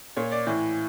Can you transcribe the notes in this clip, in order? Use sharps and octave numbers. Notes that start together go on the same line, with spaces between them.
A#2 C#5
D5
A2 E3